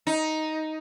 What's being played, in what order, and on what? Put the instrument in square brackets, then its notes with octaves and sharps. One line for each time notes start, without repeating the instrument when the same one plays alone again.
[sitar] D#4